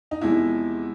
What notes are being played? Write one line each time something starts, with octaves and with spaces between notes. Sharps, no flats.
D#4
E2 C3 F3 G#3 E4